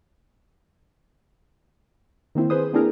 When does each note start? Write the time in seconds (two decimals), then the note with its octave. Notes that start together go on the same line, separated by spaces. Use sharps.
2.35 D#3 A#3 C4 E4
2.50 G#4 B4 C5 D#6
2.73 A#3 C4 D4 E4 G#4 A#4